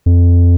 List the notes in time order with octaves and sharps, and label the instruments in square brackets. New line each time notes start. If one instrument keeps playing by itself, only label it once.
[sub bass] F2